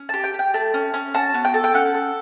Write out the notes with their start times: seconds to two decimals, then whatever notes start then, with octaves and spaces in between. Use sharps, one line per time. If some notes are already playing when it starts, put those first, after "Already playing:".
Already playing: C#4
0.09 G4 A5
0.24 G5
0.34 G4
0.39 G5
0.54 A3 A5
0.74 C#4
0.94 C#4
1.14 F#4 A5
1.34 B3
1.45 G5
1.54 A4 A5
1.64 G5
1.74 C#4 F#5
1.94 A4